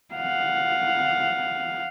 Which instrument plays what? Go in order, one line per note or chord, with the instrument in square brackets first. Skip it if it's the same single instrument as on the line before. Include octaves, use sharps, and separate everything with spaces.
[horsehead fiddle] F5 F#5